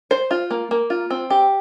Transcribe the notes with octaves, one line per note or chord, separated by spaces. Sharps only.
C5
F4
A#3
A#3
F4
C4
G4